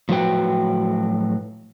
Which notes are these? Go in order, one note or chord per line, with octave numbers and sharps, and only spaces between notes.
A2 F3 F#3 F#4 B4 G5